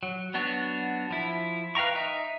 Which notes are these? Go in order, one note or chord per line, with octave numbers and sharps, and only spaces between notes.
F#3
F#3 B3 D4 F#4 C#5
F3 E4
B4 F5 G5 A#5 C#6
D#4 E5